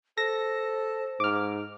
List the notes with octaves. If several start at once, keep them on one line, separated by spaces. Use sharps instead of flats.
A4 C5 A#6
G#2 D6 F6